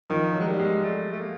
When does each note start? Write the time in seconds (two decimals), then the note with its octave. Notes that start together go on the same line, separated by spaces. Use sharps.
0.10 D#3 F3
0.34 F#3
0.40 G#3
0.47 G3
0.60 G#3
0.84 A3
1.12 A3
1.21 A#3